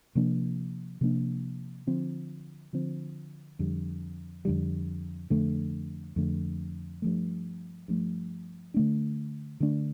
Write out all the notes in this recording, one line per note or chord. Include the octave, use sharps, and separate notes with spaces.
C3 F3 A#3 D4
C3 F3 A#3 D4
D3 F3 C4
D3 F3 C4
F2 D3 G3
F2 D3 G3
F2 D3 A3
F2 D3 A3
G2 F3 A3
G2 F3 A3
D3 A3 D4
D3 A3 D4